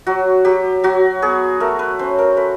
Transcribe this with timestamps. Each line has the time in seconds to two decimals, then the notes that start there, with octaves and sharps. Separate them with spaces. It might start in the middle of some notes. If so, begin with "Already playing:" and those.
0.07 F#3 F#4
0.45 F#3 G4
0.84 F#3 F#4
1.22 B3 G#4
1.60 A3 A#4
1.79 B4
1.99 C#4 C5
2.19 A#4
2.37 A3 B4